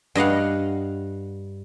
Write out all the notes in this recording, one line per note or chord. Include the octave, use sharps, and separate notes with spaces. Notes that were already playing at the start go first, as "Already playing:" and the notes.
G2 D#5 F5 F#5